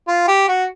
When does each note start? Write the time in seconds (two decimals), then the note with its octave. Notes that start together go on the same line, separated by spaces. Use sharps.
0.08 F4
0.28 G4
0.48 F#4